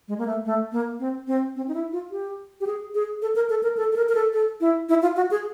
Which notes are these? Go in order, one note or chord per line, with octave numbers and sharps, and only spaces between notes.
G#3
A#3
A3
A3
A#3
C4
C4
C4
D#4
E4
F4
G4
G4
G#4
G#4
A4
A#4
A4
A#4
A4
A4
A#4
A#4
A4
A4
E4
E4
F4
F#4
G#4